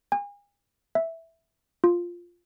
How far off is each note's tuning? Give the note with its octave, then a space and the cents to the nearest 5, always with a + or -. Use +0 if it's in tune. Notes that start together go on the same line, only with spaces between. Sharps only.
G#5 -40
E5 -5
F4 +0